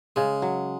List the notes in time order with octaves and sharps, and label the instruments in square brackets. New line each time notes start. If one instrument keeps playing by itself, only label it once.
[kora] C#3 [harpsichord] G#3
[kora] F#3